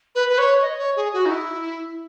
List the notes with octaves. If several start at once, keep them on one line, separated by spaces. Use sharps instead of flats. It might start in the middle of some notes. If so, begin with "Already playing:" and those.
B4
B4
C#5
D#5
C#5
G#4
F#4
D#4
E4